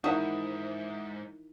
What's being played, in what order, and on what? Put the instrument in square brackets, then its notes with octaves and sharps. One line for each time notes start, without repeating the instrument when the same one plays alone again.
[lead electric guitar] G#2 [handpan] D#4 E4 A#4 [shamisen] F#4 [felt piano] E5 F#5 D#6